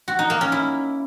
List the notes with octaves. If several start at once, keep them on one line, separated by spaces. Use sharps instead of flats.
F#4
D#4
A#3
C#4
E4